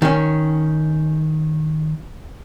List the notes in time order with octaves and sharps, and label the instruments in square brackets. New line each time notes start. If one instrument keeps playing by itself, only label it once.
[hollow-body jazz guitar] D#3 C#4